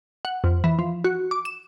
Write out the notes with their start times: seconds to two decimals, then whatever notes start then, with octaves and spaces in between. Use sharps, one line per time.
0.25 F#5
0.44 F2
0.64 E3
0.79 F3
1.04 F#4
1.31 D6
1.45 E7